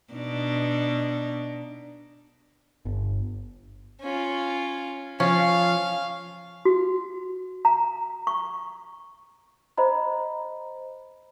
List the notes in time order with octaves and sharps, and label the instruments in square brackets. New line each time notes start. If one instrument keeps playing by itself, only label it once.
[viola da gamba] B2 D4 D#4
[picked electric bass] G1
[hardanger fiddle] C#4 F4
[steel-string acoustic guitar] F3 [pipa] C#4 [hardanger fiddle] F5
[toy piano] F#4
A#5
C#6
[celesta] C5 D#5 A#5 B5